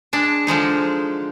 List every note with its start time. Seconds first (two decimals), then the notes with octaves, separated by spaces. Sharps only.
0.13 G#3 D4
0.47 D3 F3 G#3 D#4